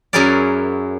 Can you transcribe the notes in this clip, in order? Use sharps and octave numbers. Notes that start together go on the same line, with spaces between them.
F#2 F#3 E4 G#4 A#4 D5